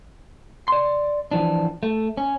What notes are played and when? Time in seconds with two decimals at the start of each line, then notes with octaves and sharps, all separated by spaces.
0.68 D5 C6
1.31 E3 F3 D4
1.83 A3
2.17 C#4